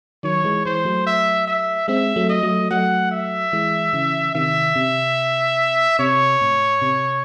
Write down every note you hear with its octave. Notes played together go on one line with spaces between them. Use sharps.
D#3 F#3 C#5
E3 G#3
E3 G#3 C5
F#3 A3
E5
E5
G#3 C4 E5
F#3 A3
D#5
F#3 A3
F#3 A3 F#5
E5
E3 G#3
C#3 E3
C3 D#3 E5
C3
C3 C#5
A2
C3